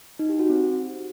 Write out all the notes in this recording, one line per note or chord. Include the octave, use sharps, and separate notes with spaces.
D#4
G4
F#4
C4